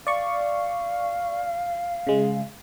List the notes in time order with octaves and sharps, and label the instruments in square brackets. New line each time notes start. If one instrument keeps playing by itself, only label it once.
[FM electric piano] D5 C#6 [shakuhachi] F5
[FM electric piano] C#3 G#3